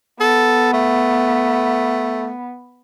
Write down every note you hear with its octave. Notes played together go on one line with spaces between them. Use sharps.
B3 A4
A3